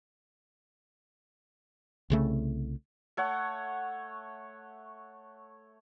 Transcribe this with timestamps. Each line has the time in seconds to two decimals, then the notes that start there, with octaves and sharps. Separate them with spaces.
2.10 C2 C#3 A3
3.17 A3 C#5 F#5